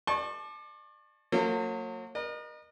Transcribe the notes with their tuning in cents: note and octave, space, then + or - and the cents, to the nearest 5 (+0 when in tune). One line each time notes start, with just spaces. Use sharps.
D5 +30 A5 -25 C#6 -30
F#3 -35 A#3 -40 F4 +0
A#4 +35 D#5 -35